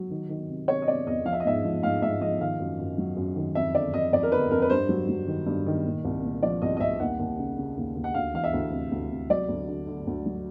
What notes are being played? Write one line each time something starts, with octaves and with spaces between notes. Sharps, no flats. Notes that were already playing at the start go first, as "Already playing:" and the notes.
Already playing: F#3
D#3
D#3
C3
C3 C#5
D#5
C3 D5
E2 D#5
F3 F5
E5
D#5
G#2 E5
F3
G#2 F5
G#2 E5
F3 D#5
D#3 F5
F#2
F#2
F#3
F#2
D#3
F2 E5
D3 D5
F2 D#5
F2 D5
A#4
D3 B4
F2 A#4
B4
G2 C5
F#3
F#3
D#3
G2
D#3
A#2
C2
A#2
F3 D5
C2 D#5
D#5
C2 E5
D#2 F#5
D#2
C#3
C#3
D#2
D#2
F#5
D2 F5
E3 F5
E5
D2
C3
D2
C3
F#3 D5
D2
D3
D3
D2
F#3